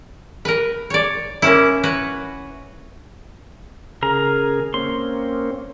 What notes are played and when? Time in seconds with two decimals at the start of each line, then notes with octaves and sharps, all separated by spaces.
0.45 A#4 B4
0.90 C#5 D5
1.42 A#3 C#4 E4
1.83 F#4 B4 C#5
4.03 C#3 G#4 A#4 A#5
4.74 A#3 C4 C#4 C6